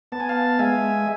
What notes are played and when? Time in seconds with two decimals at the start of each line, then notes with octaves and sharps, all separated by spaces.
0.12 B3 A5
0.20 G#5
0.29 F5 A5
0.59 G#3 E5 G#5